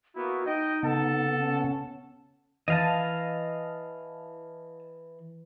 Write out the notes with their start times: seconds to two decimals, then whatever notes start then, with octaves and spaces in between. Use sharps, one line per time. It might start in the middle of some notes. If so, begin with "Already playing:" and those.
0.15 A#3 B3 E4 F#4
0.46 D#4 D#5 G5
0.83 C#3 B3 A4 F#5 A5
1.38 C#4
2.68 E3 D#5 F5 A5